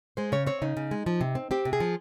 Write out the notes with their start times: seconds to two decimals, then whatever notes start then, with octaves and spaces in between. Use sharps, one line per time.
0.17 G#3 C5
0.32 C#3 C#5
0.46 C4 C#5
0.62 C#3 D#4
0.77 C#3
0.91 G#3
1.06 F3
1.21 C3
1.35 C4
1.51 C4 G4
1.65 C3
1.73 G#4
1.80 F3